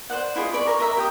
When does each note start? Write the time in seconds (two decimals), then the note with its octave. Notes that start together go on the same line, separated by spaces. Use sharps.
0.10 C5 D5 F#5
0.36 E4 F4 G#4 D#5
0.52 C#5 D5 B5 D6
0.67 A#4 C#5 D#5
0.80 A#4 D#5 E5 A#5
0.97 G4 G5 D#6